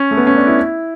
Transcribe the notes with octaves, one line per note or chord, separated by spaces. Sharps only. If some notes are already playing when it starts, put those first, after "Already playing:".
Already playing: C#4
A3
B3
C#4
D4
E4